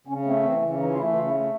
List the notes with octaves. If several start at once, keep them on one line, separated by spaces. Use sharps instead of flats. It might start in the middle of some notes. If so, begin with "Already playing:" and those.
C#3 C#4
A3 C4
E3 C4
C#3
E3 D#4
F4
A3 E4
C#3 F4
E4
A3